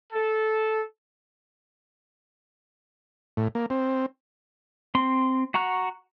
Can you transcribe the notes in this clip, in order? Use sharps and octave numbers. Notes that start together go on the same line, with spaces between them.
A4
A2
A#3
C4
C4 C6
F#4 F#5 A#5 C#6 F#6